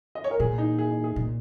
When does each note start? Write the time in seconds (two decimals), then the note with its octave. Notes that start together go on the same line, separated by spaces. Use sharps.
0.15 D#5
0.24 C#5
0.31 A#4
0.40 A#2 G#4
0.58 D#4
0.79 G#4
0.91 D#4
1.04 G#4
1.16 A#2